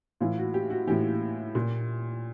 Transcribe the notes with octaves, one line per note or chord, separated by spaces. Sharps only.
A2 E3 F4
F#4
G4
F#4
A2 E3 G4
A#2